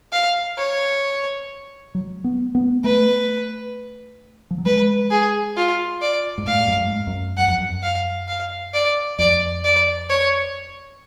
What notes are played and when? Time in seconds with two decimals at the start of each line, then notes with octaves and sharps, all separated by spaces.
0.13 F5
0.58 C#5
1.95 F#3
2.24 B3
2.55 B3
2.84 A3 B4
4.51 F3
4.58 F#3
4.66 G#3 B4
5.11 G#4
5.57 F4
6.02 D5
6.38 G#2
6.47 A2 F5
6.67 F#2
6.77 G#2
7.07 F#2
7.37 F#2 F#5
7.47 F2
7.59 F#2
7.83 F5
8.28 F5
8.74 D5
9.19 F2 D5
9.64 D5
10.10 C#5